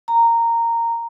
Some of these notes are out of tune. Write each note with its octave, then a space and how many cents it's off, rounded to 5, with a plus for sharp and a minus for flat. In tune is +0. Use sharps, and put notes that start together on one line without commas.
A#5 -10